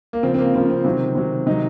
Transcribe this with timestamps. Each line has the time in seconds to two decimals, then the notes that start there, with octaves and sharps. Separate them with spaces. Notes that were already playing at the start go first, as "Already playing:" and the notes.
0.13 A#3
0.23 C#3 F3 C4
0.34 C4
0.39 A#3
0.54 C#3 F3 C4
0.70 C4
0.84 C3 D#3 F#3
1.15 C3 D#3 F#3
1.46 C3 D#3 F#3 D#4